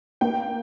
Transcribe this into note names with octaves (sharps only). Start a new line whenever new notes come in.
A#3 G5